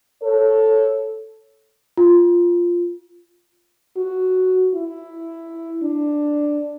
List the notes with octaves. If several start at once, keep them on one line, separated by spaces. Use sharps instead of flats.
A4 C#5
F4
F#4
E4
D4